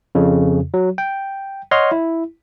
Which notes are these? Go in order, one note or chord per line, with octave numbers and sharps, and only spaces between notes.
F2 C#3
F#3
G5
C#5 D#5 F#5 C6 F6
E4